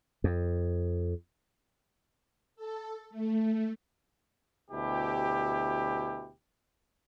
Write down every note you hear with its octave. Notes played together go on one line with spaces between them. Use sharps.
F2
A4
A3
D2 B2 E4 G4